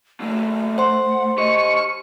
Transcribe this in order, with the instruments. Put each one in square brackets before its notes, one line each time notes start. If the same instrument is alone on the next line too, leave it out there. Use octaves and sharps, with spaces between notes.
[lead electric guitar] F#3 A#3 [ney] A3
[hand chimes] C5 C6 [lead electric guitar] F#5
[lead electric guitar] G4 D#5 [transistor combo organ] C#6